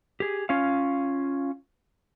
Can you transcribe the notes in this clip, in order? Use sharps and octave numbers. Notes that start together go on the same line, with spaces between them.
G4 G#4
C#4 F4 F5